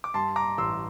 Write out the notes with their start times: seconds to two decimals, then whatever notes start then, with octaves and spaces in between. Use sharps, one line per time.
0.04 D6
0.14 G2 A5 C6
0.36 A#5 D6
0.58 A1 C6 E6